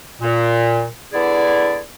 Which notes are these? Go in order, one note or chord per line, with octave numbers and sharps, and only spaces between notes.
A#2
D3 B3 E4 G#4 D5